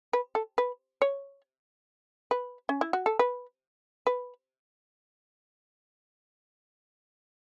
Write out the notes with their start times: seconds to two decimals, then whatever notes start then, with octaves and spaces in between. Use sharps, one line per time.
0.13 B4
0.35 A4
0.58 B4
1.02 C#5
2.31 B4
2.69 C#4
2.81 E4
2.93 F#4
3.06 A4
3.19 B4
4.07 B4